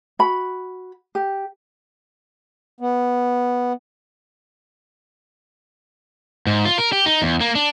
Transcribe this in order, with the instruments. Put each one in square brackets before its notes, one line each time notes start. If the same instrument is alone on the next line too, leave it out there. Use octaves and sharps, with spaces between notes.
[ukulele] F#4 B5
G4
[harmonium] B3
[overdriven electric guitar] G#2
F4
A#4
G4
D#4
E2
A#3
D4